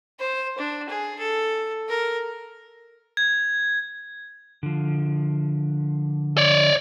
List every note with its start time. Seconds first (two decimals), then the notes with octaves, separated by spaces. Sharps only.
0.19 C5
0.58 D4
0.89 G#4
1.19 A4
1.89 A#4
3.17 G#6
4.63 D3 F3
6.37 C#5 D5